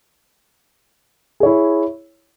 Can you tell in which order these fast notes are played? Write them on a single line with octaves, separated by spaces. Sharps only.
G#4 C#5 E4